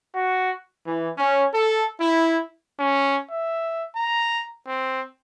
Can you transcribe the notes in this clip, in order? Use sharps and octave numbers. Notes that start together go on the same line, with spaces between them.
F#4
E3
C#4
A4
E4
C#4
E5
A#5
C4